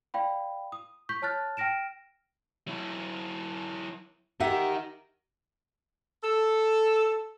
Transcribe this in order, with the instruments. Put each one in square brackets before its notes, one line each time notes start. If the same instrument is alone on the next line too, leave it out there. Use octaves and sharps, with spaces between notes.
[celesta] D5 F5 G5 B5
D#6
C#6 G6 B6
C#5 A5 F6 F#6 A6
G5 F6 A#6 D7 E7
[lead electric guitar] F#3 E4
[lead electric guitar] D#4 A#4 [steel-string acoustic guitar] G4 E5 F#5
[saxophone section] A4